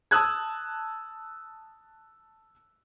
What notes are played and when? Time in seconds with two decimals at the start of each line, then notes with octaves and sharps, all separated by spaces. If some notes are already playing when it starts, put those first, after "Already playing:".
0.11 A5 D#6 E6 F#6 G#6